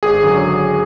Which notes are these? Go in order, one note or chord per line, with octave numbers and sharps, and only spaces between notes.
G#1 G#4
F#2 D3 F#3